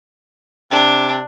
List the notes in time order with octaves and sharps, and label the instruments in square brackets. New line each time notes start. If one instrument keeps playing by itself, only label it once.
[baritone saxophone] C3 [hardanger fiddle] D4